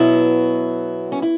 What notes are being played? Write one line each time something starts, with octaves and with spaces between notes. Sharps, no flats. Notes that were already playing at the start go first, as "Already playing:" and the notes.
Already playing: B2 F#3 B3 E4
C#4
E4